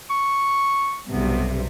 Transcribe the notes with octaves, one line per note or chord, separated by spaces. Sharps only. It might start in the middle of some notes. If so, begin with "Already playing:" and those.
C#6
B1 G2 C3 B3